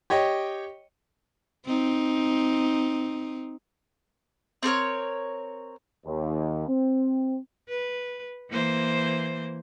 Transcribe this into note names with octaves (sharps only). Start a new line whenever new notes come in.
G4 C#5 D#5 G5
C4 D#4
C4 A4 A#4 C#5
D#2
C4
B4
E3 A#3 C5